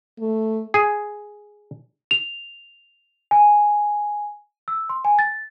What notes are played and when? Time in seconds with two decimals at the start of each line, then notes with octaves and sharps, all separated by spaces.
0.20 A3
0.74 G#4
2.11 F7
3.31 G#5
4.68 E6
4.89 C6
5.05 G#5
5.19 A6